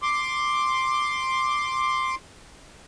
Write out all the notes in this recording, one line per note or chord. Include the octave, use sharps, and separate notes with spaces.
C6 D6